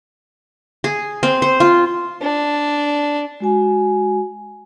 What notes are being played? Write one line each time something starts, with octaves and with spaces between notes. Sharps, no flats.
G#4
C4
C5
F4
D4
G#3 F#4 G#5